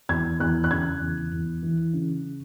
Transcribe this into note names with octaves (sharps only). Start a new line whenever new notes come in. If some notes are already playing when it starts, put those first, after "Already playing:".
E2 G#6
E2 F#6
F#6
C#3 G#6
E2
E2
E3
C#3